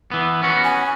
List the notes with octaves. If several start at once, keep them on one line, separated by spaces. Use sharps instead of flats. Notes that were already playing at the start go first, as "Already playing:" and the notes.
E3 B3
B3 C#4 F#4
G#5